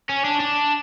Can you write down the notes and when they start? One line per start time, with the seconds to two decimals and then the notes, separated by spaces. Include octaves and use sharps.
0.09 C#4
0.25 D4
0.40 D4